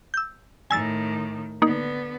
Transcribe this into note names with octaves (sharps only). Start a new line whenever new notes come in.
E6 G6
A2 D#3 G#5 E6 A6
D3 A#3 B3 D#4